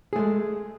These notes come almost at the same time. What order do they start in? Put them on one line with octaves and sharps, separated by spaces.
G#4 A3 G#3